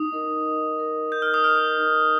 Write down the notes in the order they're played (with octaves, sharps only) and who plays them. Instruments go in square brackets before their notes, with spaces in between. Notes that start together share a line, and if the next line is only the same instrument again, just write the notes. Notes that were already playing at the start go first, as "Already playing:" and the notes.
Already playing: [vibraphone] D#4 [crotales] D#6
[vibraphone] A#4 D#5
D#4
A#4 D#5
[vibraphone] D#4 [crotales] G6
[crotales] F6
D#6
[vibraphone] A#4 D#5 [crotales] F6
[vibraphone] D#4